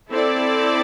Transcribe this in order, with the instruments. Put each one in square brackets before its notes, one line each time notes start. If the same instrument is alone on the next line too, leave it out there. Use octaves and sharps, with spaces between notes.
[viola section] C4 E4 A4 D5